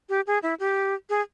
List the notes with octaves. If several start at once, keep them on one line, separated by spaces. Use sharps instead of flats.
G4
G#4
E4
G4
G#4